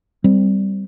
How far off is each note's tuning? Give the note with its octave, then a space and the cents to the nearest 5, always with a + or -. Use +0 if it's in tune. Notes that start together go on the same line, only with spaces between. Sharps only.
G3 +0 C4 -10